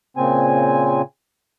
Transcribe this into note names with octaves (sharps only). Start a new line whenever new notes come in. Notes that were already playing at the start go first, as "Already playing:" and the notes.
A#2 C#3 C4 G#5